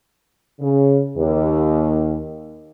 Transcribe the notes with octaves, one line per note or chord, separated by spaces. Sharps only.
C#3
D#2